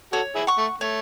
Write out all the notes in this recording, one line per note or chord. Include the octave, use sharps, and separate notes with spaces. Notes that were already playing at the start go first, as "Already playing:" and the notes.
F#4 A4 C#5
E4 G#4
F#5 C#6
A3
A3 C#5